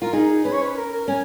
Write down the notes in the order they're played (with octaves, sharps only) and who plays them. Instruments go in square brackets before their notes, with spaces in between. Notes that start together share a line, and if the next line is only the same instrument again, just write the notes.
[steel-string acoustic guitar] F4 [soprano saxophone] A#4
[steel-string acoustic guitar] D#4 [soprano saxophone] G#4
[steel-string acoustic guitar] C#4 [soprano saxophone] B4
[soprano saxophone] C#5
B4
A#4
A#4
[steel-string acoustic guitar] C#4 [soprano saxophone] G#5